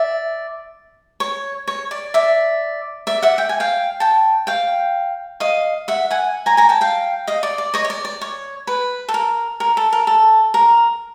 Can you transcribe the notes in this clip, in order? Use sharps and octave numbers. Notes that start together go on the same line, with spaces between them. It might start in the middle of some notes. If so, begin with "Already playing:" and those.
Already playing: D5 E5
C#5
C#5
D5
D5 E5
D5 E5
E5 F#5
G5
G#5
F5 G5
G5 A5
F5 G5
D#5 F5
E5 F#5
F#5 G#5
G#5 A#5
G#5 A#5
G5 A5
F5 G5
D#5 F5
D5
D5
C#5 D#5
C#5
D5
D5
C#5
B4
A4
A#4
A#4
A4
A#4
A4
A#4